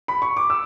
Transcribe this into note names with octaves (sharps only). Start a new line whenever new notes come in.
B5
C#6
D6
E6